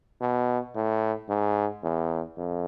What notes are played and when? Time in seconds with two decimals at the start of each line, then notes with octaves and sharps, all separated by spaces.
0.21 B2
0.75 A2
1.29 G#2
1.83 E2
2.37 F2